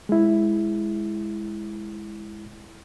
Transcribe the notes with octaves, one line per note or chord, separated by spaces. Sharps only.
G#3 E4